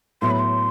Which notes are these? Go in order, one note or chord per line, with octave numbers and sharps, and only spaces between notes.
A2 F#3 B3 C6
B5
C6